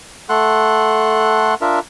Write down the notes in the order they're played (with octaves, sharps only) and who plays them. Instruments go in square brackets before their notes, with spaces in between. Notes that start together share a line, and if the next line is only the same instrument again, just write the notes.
[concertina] A3 A4 F#5 C6 F#6
D4 F4 A#4 E5